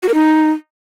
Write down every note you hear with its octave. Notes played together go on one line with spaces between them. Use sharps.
F#4
A#4
D#4